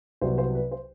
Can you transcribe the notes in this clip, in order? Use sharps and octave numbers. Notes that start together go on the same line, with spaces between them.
C2 C3 F#3 B3 C5
C5
B4
C5